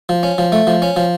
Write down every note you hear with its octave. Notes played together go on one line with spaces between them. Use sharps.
F3
C#4
F3
A3
F3
C#4
F3